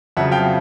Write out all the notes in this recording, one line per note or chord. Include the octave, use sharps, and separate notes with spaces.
F2 C#3 F#3 E5 F#5
F5 G5